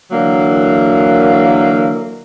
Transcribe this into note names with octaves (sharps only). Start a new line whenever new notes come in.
D3 E3 F#3 A#3